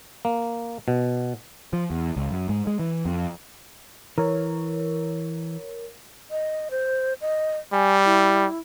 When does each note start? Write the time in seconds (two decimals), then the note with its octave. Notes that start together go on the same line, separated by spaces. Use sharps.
0.25 A#3
0.88 B2
1.73 F3
1.91 E2
2.16 C#2
2.31 F#2
2.49 G#2
2.67 G#3
2.80 E3
3.06 F2
4.18 E3 A#4 C#5
6.31 D#5
6.71 C5
7.21 D#5
7.73 G3 G#5
8.05 E4